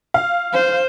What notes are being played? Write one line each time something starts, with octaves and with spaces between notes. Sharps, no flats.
F5
C5